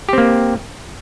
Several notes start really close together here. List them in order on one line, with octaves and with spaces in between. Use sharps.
G4 C4 A#3